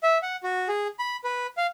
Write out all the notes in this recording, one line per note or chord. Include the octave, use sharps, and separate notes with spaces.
E5
F#5
F#4
G#4
B5
B4
F5